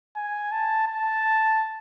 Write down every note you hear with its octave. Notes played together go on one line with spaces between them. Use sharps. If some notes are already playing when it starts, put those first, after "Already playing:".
G#5
A5
A5